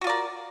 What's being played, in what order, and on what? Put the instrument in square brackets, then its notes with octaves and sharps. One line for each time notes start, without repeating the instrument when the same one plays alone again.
[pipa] F#4
F4
D5
A#4